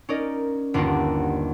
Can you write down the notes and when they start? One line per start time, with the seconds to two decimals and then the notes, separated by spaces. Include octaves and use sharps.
0.09 C#4 D#4 A#4 D5 D#5
0.74 G1 D#2 D4 F4 D#5 F#5